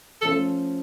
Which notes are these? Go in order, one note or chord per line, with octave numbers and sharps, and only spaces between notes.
F3 A3 C#4 F4 A4